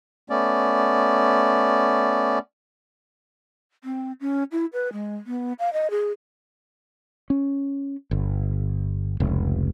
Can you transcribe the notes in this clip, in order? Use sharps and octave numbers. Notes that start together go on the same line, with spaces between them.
A3 B3 C#4 D5
C4
C#4
E4
B4
G#3
B3
F5
D#5
G#4
C#4
G1
F1 C#2